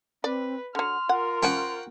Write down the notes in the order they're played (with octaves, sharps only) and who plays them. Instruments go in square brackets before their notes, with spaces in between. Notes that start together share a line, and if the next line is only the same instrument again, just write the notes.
[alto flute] C4 [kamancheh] B4 [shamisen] D5
[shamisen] D3 F#3 [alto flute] C6 [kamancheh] F6
[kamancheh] F4 A#4 [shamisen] F#5
[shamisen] F3 C#4 [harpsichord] F#5 G5 C#6